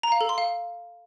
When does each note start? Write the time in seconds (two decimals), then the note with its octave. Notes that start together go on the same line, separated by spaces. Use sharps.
0.03 A#5
0.12 F5
0.21 A4
0.29 C6
0.38 F5